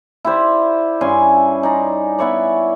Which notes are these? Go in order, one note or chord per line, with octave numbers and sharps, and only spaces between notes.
E4 G4 C5 D5
G2 C#4 G#5 C6
D#4 D5 A#5 C6
B3 E4 C#5 D5